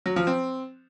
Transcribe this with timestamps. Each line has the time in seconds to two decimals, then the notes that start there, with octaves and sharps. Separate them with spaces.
0.06 F#3
0.16 F3
0.27 C4